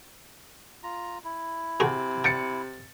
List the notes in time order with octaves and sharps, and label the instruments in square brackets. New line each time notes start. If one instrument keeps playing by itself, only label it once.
[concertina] F4 A#5
E4
[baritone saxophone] C3 [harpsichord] F#4 G#4
[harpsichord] G5 [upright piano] A6 C#7